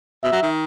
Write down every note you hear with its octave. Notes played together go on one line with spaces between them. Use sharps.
B2 E5
F#3
D#3